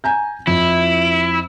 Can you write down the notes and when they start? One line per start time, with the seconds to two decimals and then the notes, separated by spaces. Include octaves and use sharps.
0.04 G#5 A#5 G6
0.47 F2 E4